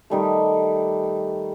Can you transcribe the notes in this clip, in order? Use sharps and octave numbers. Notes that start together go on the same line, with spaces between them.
D#3 G3 A3